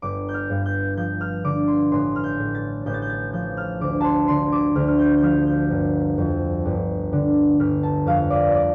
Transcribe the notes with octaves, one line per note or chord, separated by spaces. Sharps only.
G1 D6
G6
F6
G2
G6
F3 G6
F6
D3 D6
C6
A1 C6
F6
G6
A2
A6
A1 G6
A6
G6
A6
F3 G6
F6
D2 D6
A5 C6
D3 C6
D6
D2 F6
F6
G6
G6
F3 F6
G6
G1
F2
G1
D3
G1 F6
A5
F2 F5
D5
D5